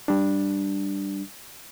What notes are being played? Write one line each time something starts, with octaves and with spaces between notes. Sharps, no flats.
G3 D4